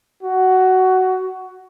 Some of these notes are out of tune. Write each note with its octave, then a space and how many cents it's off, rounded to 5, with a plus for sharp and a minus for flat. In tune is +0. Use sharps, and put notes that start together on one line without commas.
F#4 +10